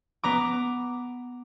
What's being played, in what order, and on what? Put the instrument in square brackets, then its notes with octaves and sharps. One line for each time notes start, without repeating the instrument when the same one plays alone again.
[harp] B3 A#5 D6